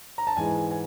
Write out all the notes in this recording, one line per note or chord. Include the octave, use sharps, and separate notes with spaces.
A#5
A5
G#2 E3 G#3 G#5
G#5